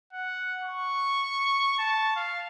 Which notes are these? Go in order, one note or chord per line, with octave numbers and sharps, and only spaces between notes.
F#5
C#6
A5
F5